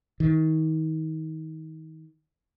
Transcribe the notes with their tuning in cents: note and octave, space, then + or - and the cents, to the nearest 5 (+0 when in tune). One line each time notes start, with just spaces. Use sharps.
D#3 +30